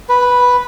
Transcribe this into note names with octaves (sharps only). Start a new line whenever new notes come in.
B4